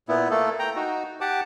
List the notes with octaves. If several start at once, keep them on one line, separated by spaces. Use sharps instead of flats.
A#2 B3 E4
A3 A#3 A4
G5 A#5
D#4 F#4
G4 F#5 A5 D6